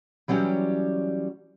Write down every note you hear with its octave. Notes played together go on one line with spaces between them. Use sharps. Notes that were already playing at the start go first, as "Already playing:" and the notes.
E3 F#3 G3 C#4 G4